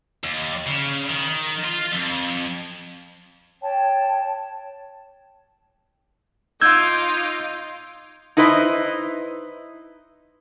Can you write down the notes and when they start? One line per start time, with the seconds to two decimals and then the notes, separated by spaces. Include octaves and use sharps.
0.24 D#2
0.67 C#3
1.10 D#3
1.64 F4
1.93 F2
3.61 C#5 G5 A5
6.61 D#4 F4 D6 E6 G6 G#6
8.37 D#4 E4 B4 C5 D#5